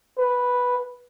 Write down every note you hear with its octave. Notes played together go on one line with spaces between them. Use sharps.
B4